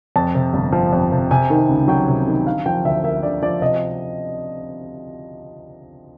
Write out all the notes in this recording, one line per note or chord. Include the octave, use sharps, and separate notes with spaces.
F2 A5
C3
G1
F3
F2
C3
C3 G#5
D#3
C#2
F#3 G5
C3
D#3
D3 F5
F3 G5
D2 E5
A#3 E5
D3 D5
F3 D5
C3 D#5